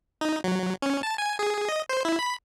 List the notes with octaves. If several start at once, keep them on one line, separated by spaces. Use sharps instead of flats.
D#4
F#3
C#4
A5
G#5
G#4
D#5
C5
E4
B5